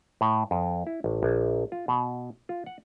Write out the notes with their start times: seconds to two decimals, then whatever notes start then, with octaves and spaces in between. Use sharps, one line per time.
0.21 A2
0.51 F2
0.87 E4
1.04 A1
1.23 A#1
1.72 F4
1.88 B2
2.49 F4
2.66 F#5